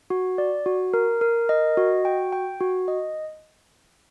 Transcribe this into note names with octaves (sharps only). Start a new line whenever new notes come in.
F#4
D5
F#4
A#4
A#4
D#5
F#4
G5
G5
F#4
D#5